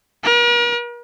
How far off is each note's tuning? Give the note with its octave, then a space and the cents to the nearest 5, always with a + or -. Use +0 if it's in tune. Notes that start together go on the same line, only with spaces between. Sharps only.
A#4 +45